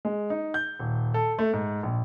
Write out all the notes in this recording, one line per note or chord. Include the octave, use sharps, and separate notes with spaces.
G#3
D#4
G6
D#1
A4
A3
G#2
A#1